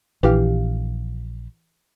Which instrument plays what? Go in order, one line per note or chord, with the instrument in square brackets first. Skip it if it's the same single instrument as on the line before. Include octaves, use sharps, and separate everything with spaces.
[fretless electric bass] A#1 [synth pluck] E3 G4 F5